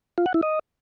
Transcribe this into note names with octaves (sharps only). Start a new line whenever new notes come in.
F4
F#5
E4
D#5